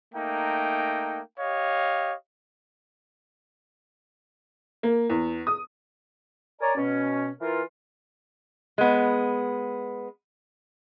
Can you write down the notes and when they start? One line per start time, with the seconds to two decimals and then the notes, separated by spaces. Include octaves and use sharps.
0.15 A3 A#3 D#4 G5
1.38 G4 C#5 D#5 F5
4.83 A#3
5.10 E2
5.47 D#6
6.61 A#4 C#5 D5 G#5 A#5
6.77 B2 C#4
7.41 E3 F4 A#4
8.78 G#3 B3